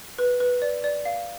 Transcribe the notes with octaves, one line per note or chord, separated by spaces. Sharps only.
B4
B4
D5
D5
F5